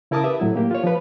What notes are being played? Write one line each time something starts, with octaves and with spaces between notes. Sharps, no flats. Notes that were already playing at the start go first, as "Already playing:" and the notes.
C#3 E4 A#4 A5 D6 D#6
G4 B4 E5
A2 F#3 E4
A#3 G4
F4 C#5
F3 B4